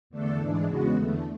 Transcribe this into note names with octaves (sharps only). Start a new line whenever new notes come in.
E2 D3 A3 D4 A4
G#2 E3 G#3 D4
E2 C#3 G#3 B3 F#4
E2 D3 A3